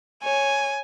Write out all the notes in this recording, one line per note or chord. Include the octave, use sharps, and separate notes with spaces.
C#5 G#5